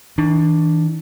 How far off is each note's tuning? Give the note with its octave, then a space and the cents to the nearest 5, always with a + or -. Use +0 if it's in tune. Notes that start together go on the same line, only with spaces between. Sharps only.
E3 -45 D4 +10